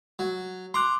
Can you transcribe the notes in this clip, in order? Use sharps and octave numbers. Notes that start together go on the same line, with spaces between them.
F#3
A#5 C6 D6 F#6